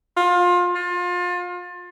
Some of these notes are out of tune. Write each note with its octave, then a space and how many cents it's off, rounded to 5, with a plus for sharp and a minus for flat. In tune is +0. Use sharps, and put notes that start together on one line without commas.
F4 +25
F4 +30